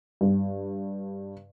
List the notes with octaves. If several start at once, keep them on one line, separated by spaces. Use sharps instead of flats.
G2